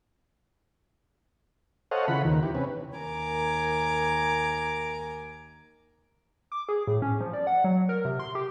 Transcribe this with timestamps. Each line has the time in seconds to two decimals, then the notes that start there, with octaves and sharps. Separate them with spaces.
1.91 A4 C5 C#5 D#5 F5 F#5
2.08 C#3 E3 F4 F#5 B5
2.25 D#2 D#3
2.43 E3 G4
2.55 C3 C#4 B4
2.95 D#2 A#4 G#5 A#5 D6
6.52 D6
6.69 G#4
6.87 A2
7.02 C#4
7.20 F3
7.34 D5
7.47 F#5
7.64 F#3
7.89 A#4
8.05 C3
8.19 C6
8.35 G4